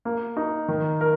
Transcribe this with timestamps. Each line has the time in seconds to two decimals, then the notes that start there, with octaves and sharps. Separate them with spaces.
0.05 A#3
0.37 D#4
0.68 D#3
1.01 A#4